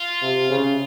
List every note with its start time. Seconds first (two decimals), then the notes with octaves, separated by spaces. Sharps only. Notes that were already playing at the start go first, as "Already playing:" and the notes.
Already playing: F4
0.22 C3
0.50 C#3